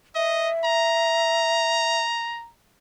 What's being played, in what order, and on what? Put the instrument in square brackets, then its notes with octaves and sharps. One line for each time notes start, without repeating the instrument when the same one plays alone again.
[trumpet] D#5 [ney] E5
[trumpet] A#5